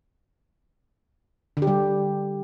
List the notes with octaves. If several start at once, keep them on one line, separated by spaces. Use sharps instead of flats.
D3
G4
G3